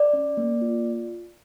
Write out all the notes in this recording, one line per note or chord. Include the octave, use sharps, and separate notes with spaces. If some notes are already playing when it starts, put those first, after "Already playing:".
Already playing: D5
C#4
A#3
F4